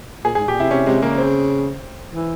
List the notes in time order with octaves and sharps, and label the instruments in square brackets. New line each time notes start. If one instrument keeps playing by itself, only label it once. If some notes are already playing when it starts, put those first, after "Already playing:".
[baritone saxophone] A#2 [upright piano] G#4
[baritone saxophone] G#2 [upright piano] G#4
[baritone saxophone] A#2 [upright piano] G4
[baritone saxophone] C3 [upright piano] E4
[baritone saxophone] C3 [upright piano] C#4
[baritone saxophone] C3 [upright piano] G#3
[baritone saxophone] C#3 [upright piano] A#3
[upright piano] C4
[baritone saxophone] E3